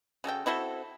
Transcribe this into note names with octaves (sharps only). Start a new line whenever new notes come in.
C#3 F#4 A4 G5
C4 E4 F#4 A4